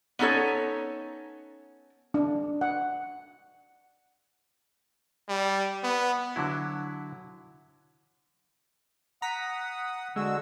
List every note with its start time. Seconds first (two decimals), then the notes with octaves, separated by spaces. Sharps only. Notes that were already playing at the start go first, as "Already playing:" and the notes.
0.19 B3 C#4 D#4 A4 C#5
2.14 D4
2.61 F#5
5.29 G3
5.83 B3
6.36 D3 F#3 E4
9.22 F#5 A#5 D#6 B6
10.16 D3 G#3 F#4 E6